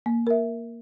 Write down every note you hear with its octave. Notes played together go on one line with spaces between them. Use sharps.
A#3
A#4 E5